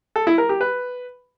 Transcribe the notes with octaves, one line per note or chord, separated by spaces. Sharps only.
A4
E4
A#4
G4
B4